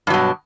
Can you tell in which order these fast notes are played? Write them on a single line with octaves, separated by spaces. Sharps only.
G2 F#3 B2